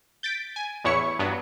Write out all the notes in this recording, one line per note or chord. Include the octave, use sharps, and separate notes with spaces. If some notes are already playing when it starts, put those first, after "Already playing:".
G6 A6 B6 D7
G#5
A1 E2 E4 C#5 C#6 C#7
G2 F#3 B3